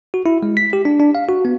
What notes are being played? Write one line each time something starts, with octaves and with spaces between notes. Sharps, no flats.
F#4
E4
G#3
B6
G4
D4
D4
F5
F#4
B3